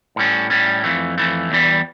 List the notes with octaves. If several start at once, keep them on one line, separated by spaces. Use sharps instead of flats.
A2 G3 C#4
A2 G3 C#4
F2 E3 A3
F2 E3 A3
E2 E3 G3